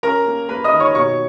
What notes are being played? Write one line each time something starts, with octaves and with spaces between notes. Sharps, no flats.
C#4 A#4 A#5
A#3
A#3 B4 B5
D#5 D#6
D#3
C#5 C#6
B2 C#5 C#6